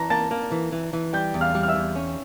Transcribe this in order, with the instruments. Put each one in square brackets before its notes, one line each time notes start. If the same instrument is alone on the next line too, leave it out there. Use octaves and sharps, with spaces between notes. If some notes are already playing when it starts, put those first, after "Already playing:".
Already playing: [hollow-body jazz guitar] E3 [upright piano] A5 A#5 A#6
[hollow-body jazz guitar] A#3 [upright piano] A5 A6
[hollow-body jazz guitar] A#3
E3
E3
E3
[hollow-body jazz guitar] G3 [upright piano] G5 G6
[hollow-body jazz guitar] E2
[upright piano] F5 F6
[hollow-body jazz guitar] G3
[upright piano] F6
E5 E6
[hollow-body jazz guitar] E2
C#4